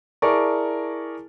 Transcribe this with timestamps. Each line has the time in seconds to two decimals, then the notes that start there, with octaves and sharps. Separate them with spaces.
0.22 E4 G#4 A#4 D5 A5 C#6